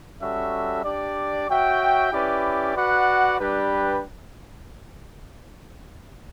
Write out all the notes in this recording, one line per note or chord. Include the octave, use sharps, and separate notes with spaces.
G3 C#4 F#4 A4 E5
D4 G4 D5
F#4 C#5 E5 G5
C#4 E4 G4 B4 D5
F#4 B4 D5 F#5
G3 D4 G4 B4